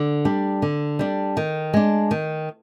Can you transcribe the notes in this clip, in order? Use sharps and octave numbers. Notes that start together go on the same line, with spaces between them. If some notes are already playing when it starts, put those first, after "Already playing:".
Already playing: D3
G3 D4
D3
G3 D4
D#3
G#3 D4
D#3